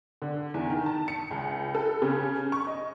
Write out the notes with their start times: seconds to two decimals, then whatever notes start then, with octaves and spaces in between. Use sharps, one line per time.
0.22 D3
0.54 E2
0.70 D#3
0.86 A5
1.08 C#7
1.31 C#2
1.75 A4
2.02 C#3
2.52 C#6
2.67 D#5